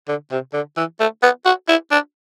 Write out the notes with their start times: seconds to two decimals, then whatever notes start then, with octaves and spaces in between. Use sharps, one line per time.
0.08 D3
0.31 C3
0.54 D3
0.77 E3
1.00 A3
1.23 B3
1.46 F#4
1.69 E4
1.91 D4